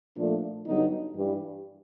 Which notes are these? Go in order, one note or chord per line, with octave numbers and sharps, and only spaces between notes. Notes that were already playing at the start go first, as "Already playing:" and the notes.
A#2 F3 A3 D4
G2 D3 F#3 B3 D#4
G2 E3 G3